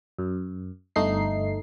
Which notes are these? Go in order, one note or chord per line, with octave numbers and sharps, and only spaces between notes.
F#2
G1 A3 D#4 C7